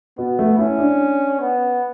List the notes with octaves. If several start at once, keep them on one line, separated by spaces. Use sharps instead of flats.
B2 B3
A3
C#4 E4
D4
B3